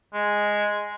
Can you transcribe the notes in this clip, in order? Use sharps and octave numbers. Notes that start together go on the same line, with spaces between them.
G#3